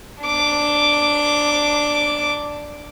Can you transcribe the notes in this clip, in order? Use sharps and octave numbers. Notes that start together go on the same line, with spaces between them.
D4 D6